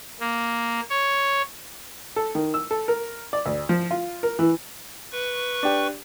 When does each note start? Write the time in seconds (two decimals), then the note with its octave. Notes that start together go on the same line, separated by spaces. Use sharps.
0.20 A#3
0.90 C#5
2.16 A4
2.35 D#3
2.54 E6
2.71 A4
2.88 A#4
3.33 D5
3.46 D2
3.69 F3
3.91 F4
4.23 A#4
4.39 E3
5.12 B4 C#6
5.63 D4 G4